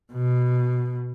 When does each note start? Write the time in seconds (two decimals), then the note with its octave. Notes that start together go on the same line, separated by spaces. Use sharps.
0.13 B2